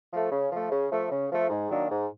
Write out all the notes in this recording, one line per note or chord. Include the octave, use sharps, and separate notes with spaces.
F3 A3
C#3
F3 A3
C#3
F3 A3
C#3
F3 A3
G#2
D#3 F#3 A#3 D4
G#2